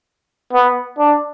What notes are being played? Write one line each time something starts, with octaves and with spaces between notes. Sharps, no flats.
B3
D4